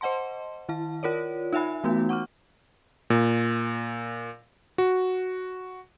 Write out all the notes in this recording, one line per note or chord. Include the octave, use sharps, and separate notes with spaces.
C5 D#5 F#5 A5 C6
D#3 E4 A5
F4 A#4 C#5 D5
D#4 F4 E5 G#5 B5
E3 A3 B3 D#4 F#4
F#5 C#6 D6 F6
A#2
F#4